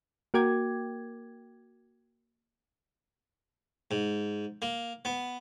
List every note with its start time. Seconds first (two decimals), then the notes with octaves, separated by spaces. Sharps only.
0.34 A#3 F#4 A#4 G5 D6 G#6
3.91 G#2
4.62 A#3
5.05 B3